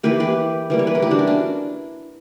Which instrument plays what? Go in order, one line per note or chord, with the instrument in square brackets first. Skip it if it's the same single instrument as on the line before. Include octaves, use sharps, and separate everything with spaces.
[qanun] E3 A#3 G4 B4
G4 B4
E3 G3 A#3
C#5
B4
A#4
E4 G4
D4 F#4
C#4
D4